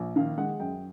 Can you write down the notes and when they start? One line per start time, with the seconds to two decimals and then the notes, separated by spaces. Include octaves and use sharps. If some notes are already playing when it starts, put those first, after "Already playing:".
Already playing: A#1
0.16 D#3 F5
0.38 G#3 F#5
0.60 F#2 G5